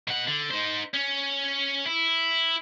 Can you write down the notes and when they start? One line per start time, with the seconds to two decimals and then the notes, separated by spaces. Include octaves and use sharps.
0.08 B2 F#5
0.27 D3
0.51 D#4 C5
0.94 C#4
1.86 E4